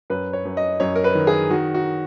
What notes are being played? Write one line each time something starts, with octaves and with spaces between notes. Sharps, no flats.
F#2 B4
C#5
F#2
D#5
F#2 C#5
A#4
B4
D#3
G#4
D#3 F#4
F#4